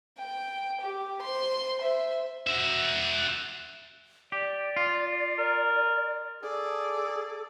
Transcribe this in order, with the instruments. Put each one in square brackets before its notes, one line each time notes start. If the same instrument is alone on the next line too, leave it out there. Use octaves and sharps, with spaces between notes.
[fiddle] G5
G4
C5 C6
C5 E5
[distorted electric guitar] F#4 E5
[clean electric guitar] G4 [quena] D5
[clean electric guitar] F4
[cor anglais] A#4
[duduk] G#4 [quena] A4 [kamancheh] D5